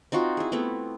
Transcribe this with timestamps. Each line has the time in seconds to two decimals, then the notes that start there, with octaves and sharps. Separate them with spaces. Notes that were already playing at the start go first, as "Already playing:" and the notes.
0.12 C4 D#4 F4 F#4
0.37 E4 G#4
0.52 A3 B3 C4 E4